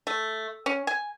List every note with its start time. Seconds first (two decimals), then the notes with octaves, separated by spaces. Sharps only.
0.07 A3
0.66 C#4
0.87 G#5